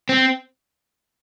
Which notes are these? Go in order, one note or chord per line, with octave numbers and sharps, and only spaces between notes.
C4